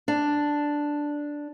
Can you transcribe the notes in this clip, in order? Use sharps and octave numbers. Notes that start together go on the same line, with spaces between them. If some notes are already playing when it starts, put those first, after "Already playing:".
D4